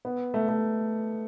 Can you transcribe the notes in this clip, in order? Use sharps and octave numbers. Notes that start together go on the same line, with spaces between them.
B3
A3
A3